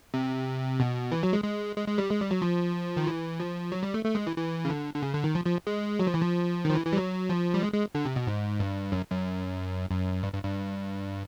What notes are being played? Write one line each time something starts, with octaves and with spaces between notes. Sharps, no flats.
C3
B2
E3
F#3
G#3
G#3
G#3
G#3
G3
G#3
G3
F#3
F3
D#3
E3
F3
F#3
G3
A3
A3
G#3
E3
E3
C#3
D3
D3
C#3
D3
D#3
F3
F3
G#3
F#3
F3
E3
F3
D#3
F3
E3
E3
G3
F#3
F3
G3
G#3
G#3
D3
C3
B2
G#2
G2
F#2
F#2
F#2
G2
G2
G2